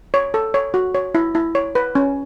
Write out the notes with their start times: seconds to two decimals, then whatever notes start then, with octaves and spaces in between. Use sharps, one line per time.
0.14 C#5
0.34 A4
0.54 C#5
0.74 F#4
0.95 C#5
1.15 E4
1.35 E4
1.55 C#5
1.75 B4
1.95 C#4